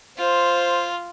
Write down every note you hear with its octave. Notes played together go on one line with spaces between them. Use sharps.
F4 C5